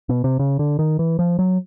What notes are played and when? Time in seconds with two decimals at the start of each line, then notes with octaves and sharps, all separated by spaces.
0.09 B2
0.24 C3
0.39 C#3
0.59 D3
0.79 D#3
0.99 E3
1.19 F3
1.39 F#3